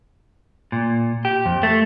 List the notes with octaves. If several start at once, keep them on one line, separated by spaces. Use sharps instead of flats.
A#2
G4
F2
A3